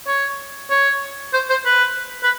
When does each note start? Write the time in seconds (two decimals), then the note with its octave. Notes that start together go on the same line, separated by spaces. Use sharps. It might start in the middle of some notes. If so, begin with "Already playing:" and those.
0.07 C#5
0.70 C#5
1.33 C5
1.50 C5
1.65 B4
2.23 B4